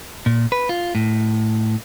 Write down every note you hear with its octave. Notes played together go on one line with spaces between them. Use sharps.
A#2
B4
F4
A2